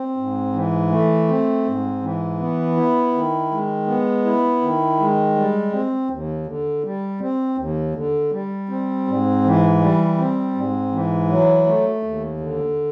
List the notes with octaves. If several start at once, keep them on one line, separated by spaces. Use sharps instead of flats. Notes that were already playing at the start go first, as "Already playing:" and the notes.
Already playing: C4
G#2
E3
A3
C4
G#2
E3
B3
E4
D#3
G#3
B3
E4
D#3
G#3
G3
C4
D#2
D3
G3
C4
D#2
D3
G3
C4
G#2
E3
G3
C4
G#2
E3
F#3
A3
D#2
D3